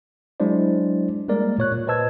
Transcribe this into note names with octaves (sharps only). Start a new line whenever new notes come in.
F#3 G#3 D4 E4 C5 D5
G3 G#3 A#3 A#4 D5
A#2 C#5 F#6
A#2
B4 C5 D#5 A5 E6 G#6